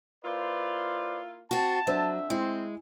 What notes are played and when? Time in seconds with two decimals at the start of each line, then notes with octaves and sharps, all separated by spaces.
0.25 A#3 E4 F4 B4 C5 D5
1.51 C4 F#4 A5
1.87 F2 D3 F#3 D4 C5 E5 E6
2.30 G#3 C4 E4